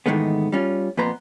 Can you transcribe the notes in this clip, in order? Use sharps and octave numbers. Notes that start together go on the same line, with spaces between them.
G#2 D#3 E3 G#3 A3 B3
G3 C#4 F4
F2 A#2 B3 B4 A#5 C6